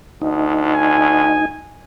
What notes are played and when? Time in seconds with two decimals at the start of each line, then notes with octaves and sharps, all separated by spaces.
0.22 D2 D#4
0.75 G#5